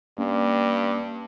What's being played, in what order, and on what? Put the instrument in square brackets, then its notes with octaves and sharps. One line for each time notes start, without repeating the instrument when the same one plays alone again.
[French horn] G2 [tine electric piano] A#3 C#4